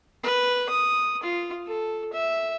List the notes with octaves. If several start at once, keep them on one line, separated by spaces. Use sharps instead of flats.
B4
D#6
F4
A4
E5